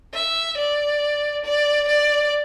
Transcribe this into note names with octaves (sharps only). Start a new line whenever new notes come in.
E5
D5
D5
D5